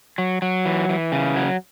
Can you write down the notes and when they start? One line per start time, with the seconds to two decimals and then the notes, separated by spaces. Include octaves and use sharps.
0.18 F#3
0.42 F#3
0.66 E3
0.89 E3
1.12 C#3
1.36 F#3